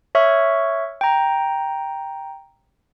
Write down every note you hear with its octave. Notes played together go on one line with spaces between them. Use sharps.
C#5 E5 C#6 F6
G5 A#5